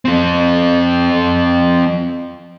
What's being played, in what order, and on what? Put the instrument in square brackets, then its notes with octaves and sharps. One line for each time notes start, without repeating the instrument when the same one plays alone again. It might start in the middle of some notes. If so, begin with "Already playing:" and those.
[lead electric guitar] F3 C4